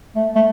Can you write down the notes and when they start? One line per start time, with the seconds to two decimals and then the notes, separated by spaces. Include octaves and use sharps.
0.16 A3
0.35 A3